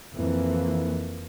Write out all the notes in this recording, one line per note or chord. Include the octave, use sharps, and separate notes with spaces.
F2 E3 A#3